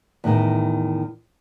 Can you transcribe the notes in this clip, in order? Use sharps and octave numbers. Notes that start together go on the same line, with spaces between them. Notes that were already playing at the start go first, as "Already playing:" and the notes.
E2 A2 D#3